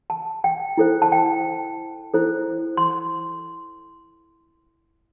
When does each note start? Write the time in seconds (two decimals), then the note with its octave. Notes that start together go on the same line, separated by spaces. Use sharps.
0.10 A5
0.44 G5
0.78 E4 A4 C5
1.02 A5
1.12 G5
2.14 E4 A4 C5
2.77 C6